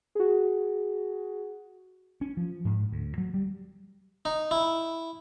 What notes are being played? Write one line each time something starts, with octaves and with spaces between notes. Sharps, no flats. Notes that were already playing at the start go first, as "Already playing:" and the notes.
F#4 G#4
C#4
F3
G#2
D2
F#3
G3
D#4
E4